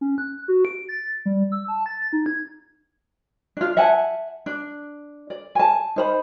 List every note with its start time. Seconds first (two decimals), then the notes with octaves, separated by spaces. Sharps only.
0.01 C#4
0.18 F#6
0.48 F#4
0.65 D7
0.89 A6
1.26 G3
1.52 E6
1.68 A5
1.86 A6
2.13 D#4
2.26 G#6
3.57 D4 F4
3.77 E5 F#5 G#5 A5
4.46 D4
5.30 D5
5.55 G#5 A5
5.96 D#4 C5 B5